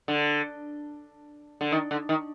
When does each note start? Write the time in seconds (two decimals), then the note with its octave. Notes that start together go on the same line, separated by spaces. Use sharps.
0.08 D3
1.61 D3
1.72 D#3
1.91 D3
2.09 D#3